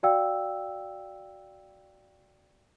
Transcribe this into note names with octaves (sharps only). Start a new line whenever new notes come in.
F#4 D5 F5 G5 E6